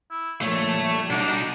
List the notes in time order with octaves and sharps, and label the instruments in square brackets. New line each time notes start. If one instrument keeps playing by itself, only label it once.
[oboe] E4
[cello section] A#2 D3 F3 [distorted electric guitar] A3 [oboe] C#5
[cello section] G3
[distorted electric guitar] B2 D#4 [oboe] D4